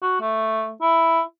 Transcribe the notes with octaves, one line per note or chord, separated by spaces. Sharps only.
F#4
A3
E4